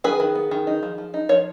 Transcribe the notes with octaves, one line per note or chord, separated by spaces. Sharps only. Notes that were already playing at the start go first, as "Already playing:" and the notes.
D#3 G#4 B4
D#3
B3
D#3
D#4
F3
F3
D#4
F3 C#5